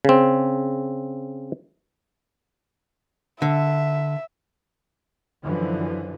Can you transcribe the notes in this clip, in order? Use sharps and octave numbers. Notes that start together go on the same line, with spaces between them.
C#3 C4
D3 E5
F#2 D3 E3 F3